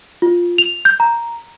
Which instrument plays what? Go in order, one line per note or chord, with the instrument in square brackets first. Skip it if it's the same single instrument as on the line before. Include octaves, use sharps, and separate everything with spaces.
[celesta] F4
F7
G6
A#5